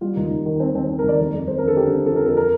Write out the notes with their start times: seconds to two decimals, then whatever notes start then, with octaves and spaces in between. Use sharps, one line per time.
0.01 G3 F4
0.16 D#2 D#4
0.31 D#2
0.46 D#3
0.60 D#3 C4
0.74 D#2 C4
0.89 D#3 C4
0.99 A#4
1.04 D#2 D5
1.20 F2
1.33 F2
1.48 F2 C5
1.58 A#4
1.63 D3 A4
1.77 D3 G4
1.92 F2
2.06 F3 A4
2.16 A#4
2.22 F2 A4
2.37 A#4